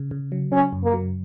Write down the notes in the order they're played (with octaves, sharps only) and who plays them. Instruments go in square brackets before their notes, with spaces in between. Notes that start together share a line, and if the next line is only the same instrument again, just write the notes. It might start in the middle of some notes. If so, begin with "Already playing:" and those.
Already playing: [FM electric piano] C#3
C#3
F#3
[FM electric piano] F#3 [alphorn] C#4
[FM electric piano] F#2
[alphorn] A#3
[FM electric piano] F#3